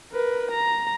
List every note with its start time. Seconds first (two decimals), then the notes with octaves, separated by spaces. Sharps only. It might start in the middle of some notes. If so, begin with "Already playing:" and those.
0.12 A#4 B4
0.51 A#5